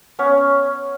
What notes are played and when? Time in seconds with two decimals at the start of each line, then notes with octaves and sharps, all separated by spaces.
0.19 B3 C#4 C#5 F#5